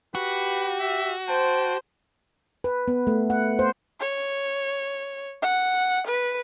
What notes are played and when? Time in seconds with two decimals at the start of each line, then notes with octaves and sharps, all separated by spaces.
0.15 F#4 G4 B4
0.80 E5
1.28 C5 G5 A5
2.64 B4
2.88 B3
3.07 A3
3.30 F#5
3.59 C5
4.00 C#5
5.42 F#5
6.07 B4